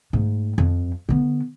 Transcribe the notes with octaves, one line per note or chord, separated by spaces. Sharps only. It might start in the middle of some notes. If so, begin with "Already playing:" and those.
G#2 A3
F2 F3
D3 B3